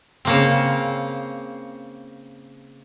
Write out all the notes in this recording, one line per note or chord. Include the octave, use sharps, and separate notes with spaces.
C#3 A#3 C4